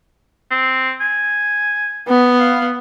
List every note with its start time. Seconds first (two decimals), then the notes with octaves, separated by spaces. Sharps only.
0.51 C4
1.01 G#5
2.08 B3
2.39 F5